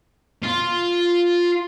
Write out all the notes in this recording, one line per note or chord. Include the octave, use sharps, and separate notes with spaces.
F4